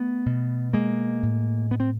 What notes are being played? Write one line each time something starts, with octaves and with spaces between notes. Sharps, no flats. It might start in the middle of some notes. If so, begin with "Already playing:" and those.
Already playing: A3 B3
B2
G#3 A#3
A2
B3
C4